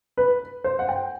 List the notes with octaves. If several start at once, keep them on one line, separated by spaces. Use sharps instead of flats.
B4
C5
F#5
G5